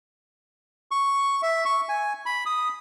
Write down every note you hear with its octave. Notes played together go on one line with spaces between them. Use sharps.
C#6
E5
C#6
G#5
B5
D#6